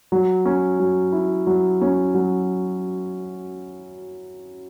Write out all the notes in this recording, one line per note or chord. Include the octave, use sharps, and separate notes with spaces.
F#3
C#4
F#3
E4
F#3
C#4
F#3